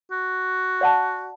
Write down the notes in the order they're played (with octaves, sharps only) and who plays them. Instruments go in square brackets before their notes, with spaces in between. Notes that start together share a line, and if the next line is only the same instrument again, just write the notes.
[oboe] F#4
[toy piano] D5 F#5 A5